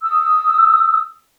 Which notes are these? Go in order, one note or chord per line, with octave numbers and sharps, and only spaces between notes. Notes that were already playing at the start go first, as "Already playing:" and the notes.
D#6 E6